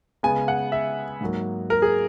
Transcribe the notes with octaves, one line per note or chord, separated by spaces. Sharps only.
C#3 G#3 B3 G#5
F#5
E5
G#2 F#3 A#3
A#4
G#4